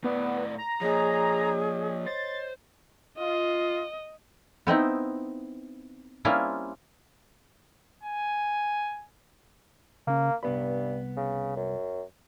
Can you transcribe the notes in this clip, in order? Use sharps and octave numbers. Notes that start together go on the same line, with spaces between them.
A2 B3 D5
A#5
F3 A#3 G#4 C#5 D#5
C5 A6
F4 D#5
B3 C4 D#4 E4
G3 A#3 C4 C#4 E4 F4
G#5
C#3 A#3 C#4
C2 G2 B3 B5
C#3
F#2